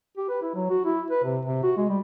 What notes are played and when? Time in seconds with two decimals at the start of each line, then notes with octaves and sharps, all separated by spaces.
0.17 G4
0.29 B4
0.42 E4
0.55 F#3
0.70 F#4
0.85 E4
1.11 B4
1.24 C3
1.46 C3
1.63 F#4
1.77 G#3
1.89 G3